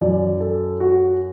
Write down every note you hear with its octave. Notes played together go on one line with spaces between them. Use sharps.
F#2 F#3 D5
A4
F#4